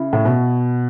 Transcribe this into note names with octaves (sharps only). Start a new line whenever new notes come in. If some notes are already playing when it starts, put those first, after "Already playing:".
Already playing: C#3 E4
A2
B2